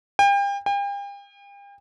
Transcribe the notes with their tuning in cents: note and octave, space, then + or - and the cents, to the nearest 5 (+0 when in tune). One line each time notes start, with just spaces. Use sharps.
G5 +35
G5 +40